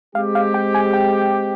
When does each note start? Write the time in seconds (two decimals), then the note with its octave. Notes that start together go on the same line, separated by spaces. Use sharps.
0.15 G#3 C4 G4 F5
0.35 F5
0.54 G5
0.75 G#5
0.93 G5